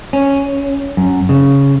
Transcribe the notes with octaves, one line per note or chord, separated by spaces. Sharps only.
C#4
F#2
C#3